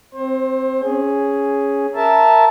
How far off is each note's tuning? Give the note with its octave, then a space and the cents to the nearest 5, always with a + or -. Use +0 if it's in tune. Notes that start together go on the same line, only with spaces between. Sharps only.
C4 +0 C5 +30
C#4 +5 G#4 +0
A#4 -5 E5 +0 A5 -10